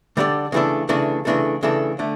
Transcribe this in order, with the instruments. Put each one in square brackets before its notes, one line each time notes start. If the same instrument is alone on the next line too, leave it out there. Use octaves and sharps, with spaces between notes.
[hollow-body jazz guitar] D3 G3 D4 A4 D5
C#3 E3 A3 D4 A4
C#3 E3 A3 D4 A4
C#3 E3 A3 D4 A4
C#3 E3 A3 D4 A4
D3 A3